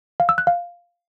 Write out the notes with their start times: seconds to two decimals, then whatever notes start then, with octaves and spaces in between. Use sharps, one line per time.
0.20 F5
0.29 E6
0.38 F#6
0.47 F5